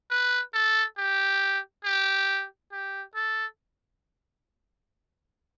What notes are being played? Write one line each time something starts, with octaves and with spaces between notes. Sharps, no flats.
B4
A4
G4
G4
G4
A4